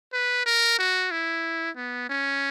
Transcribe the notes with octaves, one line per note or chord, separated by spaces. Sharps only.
B4
A#4
F#4
E4
B3
C#4